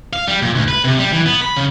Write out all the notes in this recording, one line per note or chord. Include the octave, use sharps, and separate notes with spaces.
F5
G3
A#2
D2
B4
C3
G3
E3
B3
B5
C#3